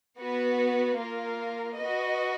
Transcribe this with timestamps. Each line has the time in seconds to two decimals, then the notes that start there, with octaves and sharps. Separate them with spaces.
0.19 B3 F#4 B4
0.98 A#3 F4 A#4
1.77 F#4 B4 D#5